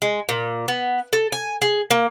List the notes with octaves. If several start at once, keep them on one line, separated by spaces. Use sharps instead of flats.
G#3
A#2
B3
A4
G#5
G#4
A#3